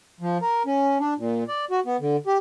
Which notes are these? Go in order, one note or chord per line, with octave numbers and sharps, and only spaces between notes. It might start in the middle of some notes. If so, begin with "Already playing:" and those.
F3
A#4
C#4
D4
A#2
D5
F#4
B3
D3
G4